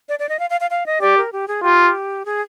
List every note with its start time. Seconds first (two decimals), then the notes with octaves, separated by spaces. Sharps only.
0.09 D5
0.19 D5
0.29 D#5
0.39 F5
0.50 F5
0.61 F5
0.71 F5
0.86 D#5
1.01 G4 D5
1.17 A#4
1.32 G4
1.48 G#4
1.63 F4 G4
2.25 G#4